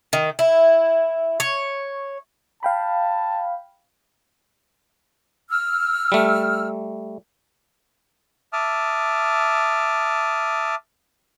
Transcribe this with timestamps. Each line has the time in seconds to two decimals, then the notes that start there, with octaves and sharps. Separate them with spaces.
0.13 D#3
0.39 E4
1.40 C#5
2.63 F5 G5 A5 B5
5.50 E6 F6
6.12 G3 A3
8.53 E5 A5 D6 D#6 F6